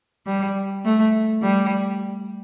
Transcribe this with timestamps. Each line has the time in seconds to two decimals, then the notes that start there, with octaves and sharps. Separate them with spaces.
0.26 G3
0.85 A3
1.42 G3